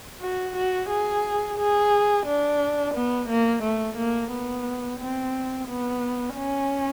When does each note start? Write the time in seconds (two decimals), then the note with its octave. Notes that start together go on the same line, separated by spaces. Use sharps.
0.21 F#4
0.56 F#4
0.90 G#4
1.59 G#4
2.26 D4
2.95 B3
3.29 A#3
3.63 A3
3.97 A#3
4.31 B3
5.00 C4
5.68 B3
6.36 C#4